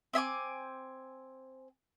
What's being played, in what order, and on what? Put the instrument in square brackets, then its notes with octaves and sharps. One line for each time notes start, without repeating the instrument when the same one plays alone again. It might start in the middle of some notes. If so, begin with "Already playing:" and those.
[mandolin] C4 E5 G#5 D6